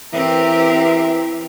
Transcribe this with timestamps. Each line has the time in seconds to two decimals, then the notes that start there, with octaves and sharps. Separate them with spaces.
0.13 E3 C4 G4 A#4 B4 E5